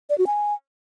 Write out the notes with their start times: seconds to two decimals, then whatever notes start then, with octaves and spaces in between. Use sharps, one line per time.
0.10 D5
0.18 F#4
0.27 G#5